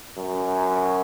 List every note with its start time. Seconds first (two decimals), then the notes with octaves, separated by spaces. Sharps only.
0.17 F#2